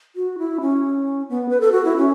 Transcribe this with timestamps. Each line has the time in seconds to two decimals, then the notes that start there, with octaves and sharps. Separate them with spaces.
0.16 F#4
0.39 E4
0.61 C#4
1.29 B3
1.49 B4
1.61 A4
1.72 F#4
1.85 E4
1.97 C#4